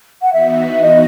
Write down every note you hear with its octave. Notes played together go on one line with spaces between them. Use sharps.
F#5
E3 B3 D#4 F#4 E5
D#5